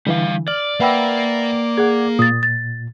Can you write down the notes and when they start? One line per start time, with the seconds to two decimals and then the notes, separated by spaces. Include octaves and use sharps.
0.07 D3 E3 G3 F5
0.48 D5 F6 F#7
0.80 A#3 B4 E5 F#5 G5 B5 E6
1.77 G#4 F#5 G#6
2.19 A#2 D#6 A6
2.43 A6